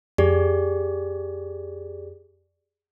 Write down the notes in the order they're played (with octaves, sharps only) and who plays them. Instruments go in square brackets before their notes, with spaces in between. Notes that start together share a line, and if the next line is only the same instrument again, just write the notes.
[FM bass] F2 [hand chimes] G4 G#4 D5